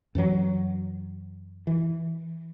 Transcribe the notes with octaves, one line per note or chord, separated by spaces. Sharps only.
F#2 E3 F#3
E3